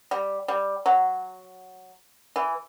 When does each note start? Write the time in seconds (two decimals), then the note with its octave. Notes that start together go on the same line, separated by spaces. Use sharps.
0.11 G3
0.48 G3
0.86 F#3
2.36 E3